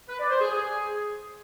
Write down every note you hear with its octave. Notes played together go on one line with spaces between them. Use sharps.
B4
D5
C5
G#4
G#4